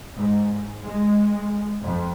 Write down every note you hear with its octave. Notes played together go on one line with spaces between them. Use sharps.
G#2
G#3
F2